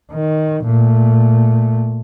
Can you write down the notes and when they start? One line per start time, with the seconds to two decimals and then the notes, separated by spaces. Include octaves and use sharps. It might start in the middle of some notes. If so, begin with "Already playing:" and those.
0.11 D#3
0.65 A#2 A3